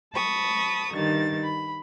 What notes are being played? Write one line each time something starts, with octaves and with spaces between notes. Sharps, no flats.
A5 B5 C#6 D#6
G2 D#3 A6
B5